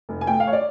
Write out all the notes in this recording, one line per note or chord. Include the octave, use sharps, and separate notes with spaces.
F1
G#5
A3 G5
F5
C#5
D5